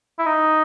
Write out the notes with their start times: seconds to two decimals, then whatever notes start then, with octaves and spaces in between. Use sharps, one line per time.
0.19 E4
0.26 D#4